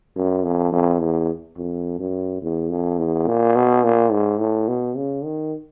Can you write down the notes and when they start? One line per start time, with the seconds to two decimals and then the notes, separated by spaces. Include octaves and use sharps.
0.16 F#2
0.45 F2
0.73 F2
1.01 E2
1.57 F2
2.00 F#2
2.42 E2
2.70 F2
2.99 E2
3.27 A#2
3.56 B2
3.84 A#2
4.12 G#2
4.40 A2
4.68 B2
4.97 C#3
5.25 D#3